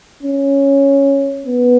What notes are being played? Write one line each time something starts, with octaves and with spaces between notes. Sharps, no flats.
C#4
B3